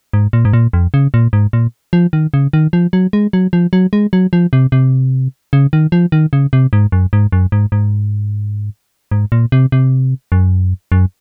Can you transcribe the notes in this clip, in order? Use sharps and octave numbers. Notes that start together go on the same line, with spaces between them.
G#2
A#2
G#2
A#2
F2
C#3
A#2
G#2
A#2
F3
D#3
C#3
D#3
F3
F#3
G#3
F#3
F3
F#3
G#3
F#3
F3
C3
C3
C#3
D#3
F3
D#3
C#3
C3
G#2
F#2
G#2
F#2
G#2
G#2
G#2
A#2
C3
C3
F#2
F#2